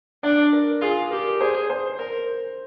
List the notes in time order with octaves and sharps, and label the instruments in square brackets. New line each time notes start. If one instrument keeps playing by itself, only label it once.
[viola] D4 [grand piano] D5
[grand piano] A#4
[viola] F4 [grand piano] G#4
[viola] G4 [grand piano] A#4
[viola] G#4 [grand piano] C5
[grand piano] C5
[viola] A#4 [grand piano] C5